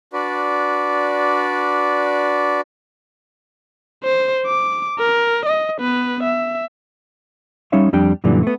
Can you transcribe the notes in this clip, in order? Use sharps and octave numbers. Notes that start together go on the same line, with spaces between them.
D4 F#4 B4 D5
C5
D6
A#4
D#5
B3 B4
E5
G3 C#4 D#4 C#5 E5 F5
F2 G3 D4 G5
F#2 A#2 D3 E3 G3
A3 B3